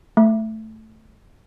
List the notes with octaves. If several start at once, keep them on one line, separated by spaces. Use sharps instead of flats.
A3